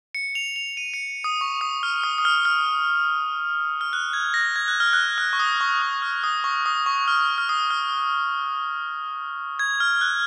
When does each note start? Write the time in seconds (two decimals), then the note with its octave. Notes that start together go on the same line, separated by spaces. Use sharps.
0.15 C#7
0.35 F7
0.56 F7
0.77 D#7
0.94 C#7
1.24 D#6
1.41 C#6
1.61 D#6
1.83 F6
2.04 D#6
2.18 D#6
2.25 F6
2.45 F6
3.81 F6
3.93 F#6
4.13 G#6
4.34 A#6
4.56 G#6
4.68 F#6
4.80 F6
4.93 F#6
5.18 F6
5.33 C#6
5.40 D#6
5.61 C#6
5.82 D#6
6.02 F6
6.24 D#6
6.44 C#6
6.66 D#6
6.86 C#6
7.08 F6
7.38 F6
7.49 D#6
7.70 F6
9.59 G#6
9.80 F6
10.01 F#6